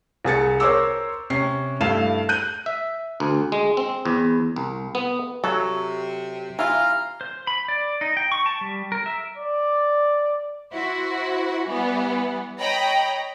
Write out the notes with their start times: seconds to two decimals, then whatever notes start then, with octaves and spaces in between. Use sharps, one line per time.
0.25 C2 G#4 A6 C#7
0.60 A#4 C5 C#5 D6 E6
1.30 C3 C#4 C7
1.81 G2 A3 E4 F5 E7
2.29 F#6 G6 D#7
2.66 E5
3.20 D2
3.52 G#3
3.77 C4
4.05 E2
4.56 C2
4.95 B3
5.44 C3 F#3 A4
6.59 E3 F4 F5 A#5 F6
7.21 C5
7.47 B5
7.68 D5
8.01 D#4
8.17 G5
8.32 C#6
8.46 A5
8.61 G3
8.92 A#4
9.06 E5
9.37 D5
10.73 E4 F#4 C5
11.66 E3 G3 B3
12.60 C#5 D#5 G5 A#5 B5